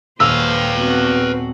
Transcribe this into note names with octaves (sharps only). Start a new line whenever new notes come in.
D#1 A#3 B4 C5 F5 E6
B3 C4 F#4